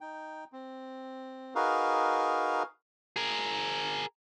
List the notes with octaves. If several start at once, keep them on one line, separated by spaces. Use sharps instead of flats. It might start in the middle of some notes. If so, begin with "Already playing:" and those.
D#4 G5
C4
D#4 F#4 G#4 A#4 B4 F5
G#4 A#4